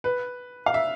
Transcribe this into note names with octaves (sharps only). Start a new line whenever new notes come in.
B4
F5
E5